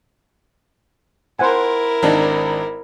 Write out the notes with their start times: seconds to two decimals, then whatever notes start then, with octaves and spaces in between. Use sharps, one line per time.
1.39 E4 A#4 C5 F#5 G#5
2.03 G#1 D4 D#4